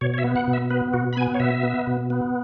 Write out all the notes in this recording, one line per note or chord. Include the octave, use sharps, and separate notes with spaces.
B2 C#5
C#5
E5
B3
F#5
B2
E5
B3 B4
B2 F#4
B5
B3 G#5
C#5
B2 E5
B3
B2
B3